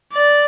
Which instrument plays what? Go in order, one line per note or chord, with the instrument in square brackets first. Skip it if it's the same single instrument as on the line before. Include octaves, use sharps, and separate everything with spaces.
[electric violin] D5